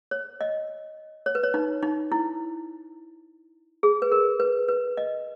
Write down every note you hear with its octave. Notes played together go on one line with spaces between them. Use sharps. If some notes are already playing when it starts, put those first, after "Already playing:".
C#5
D#5
C#5
B4
C#5
D#4
D#4
E4
G#4
B4
A#4
B4
B4
D#5